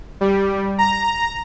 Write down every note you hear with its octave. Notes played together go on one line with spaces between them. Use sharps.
G3
A#5